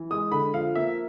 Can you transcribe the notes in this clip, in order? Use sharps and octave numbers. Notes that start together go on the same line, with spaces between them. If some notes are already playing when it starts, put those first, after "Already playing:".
Already playing: E3
G#3 D#6
D3 B5
F3 F5
A#3 E5